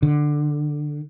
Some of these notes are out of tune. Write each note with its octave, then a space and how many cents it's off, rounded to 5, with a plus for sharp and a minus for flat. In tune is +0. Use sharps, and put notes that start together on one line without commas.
D3 +15